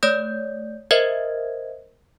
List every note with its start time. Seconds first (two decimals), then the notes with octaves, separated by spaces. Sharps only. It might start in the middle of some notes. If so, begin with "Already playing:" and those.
0.03 A3 C#5 D5 D#6 G6
0.91 A#4 C5 D#5 E5 G#6